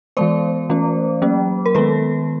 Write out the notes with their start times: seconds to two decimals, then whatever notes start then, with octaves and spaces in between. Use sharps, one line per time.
0.17 E3 G#3 B3 C5 D5
0.69 E3 A3 C#4
1.22 F#3 A#3 C#4
1.66 A#4
1.75 D#3 G#3 B3 A4 B4